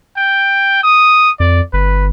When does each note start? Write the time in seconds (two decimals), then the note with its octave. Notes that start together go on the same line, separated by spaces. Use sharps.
0.17 G5
0.83 D#6
1.40 F2 D5
1.73 G1 B4